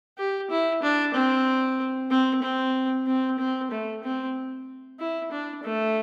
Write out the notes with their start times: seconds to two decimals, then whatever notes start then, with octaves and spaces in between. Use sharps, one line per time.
0.18 G4
0.50 E4
0.82 D4
1.14 C4
2.11 C4
2.42 C4
3.07 C4
3.39 C4
3.71 A3
4.03 C4
5.00 E4
5.31 D4
5.64 A3